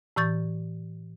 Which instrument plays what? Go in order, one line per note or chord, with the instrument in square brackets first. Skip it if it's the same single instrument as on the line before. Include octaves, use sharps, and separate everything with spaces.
[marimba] A2 E3 C#6 G6 A6